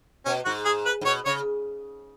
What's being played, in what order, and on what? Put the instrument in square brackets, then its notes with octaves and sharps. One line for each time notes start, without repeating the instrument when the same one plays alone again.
[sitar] B2 [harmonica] C#4
[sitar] G#2 [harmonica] F#4
[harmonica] G#4
B4
[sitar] G#2
[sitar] B2 [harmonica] C#5
[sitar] C#3 [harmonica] C#5